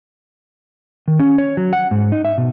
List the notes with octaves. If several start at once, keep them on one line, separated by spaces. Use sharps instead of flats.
D#3
C#4
C#5
F#3
F#5
G#2
D#4
E5
B2